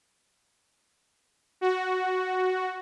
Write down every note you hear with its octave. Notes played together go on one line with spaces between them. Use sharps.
F#4